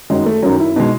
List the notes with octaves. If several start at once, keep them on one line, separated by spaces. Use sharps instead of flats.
F#2 D#3 F#3 G#3
A3
F#2 D#3 F#3 C#4
E4
B2 G#3 D#4